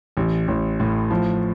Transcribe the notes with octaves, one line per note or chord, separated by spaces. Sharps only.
A1
A1
A2
F3